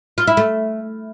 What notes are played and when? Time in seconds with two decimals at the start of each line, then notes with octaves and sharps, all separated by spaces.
0.18 F4
0.27 E4
0.37 A3